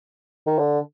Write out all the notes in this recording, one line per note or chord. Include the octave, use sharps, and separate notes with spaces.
D#3
D3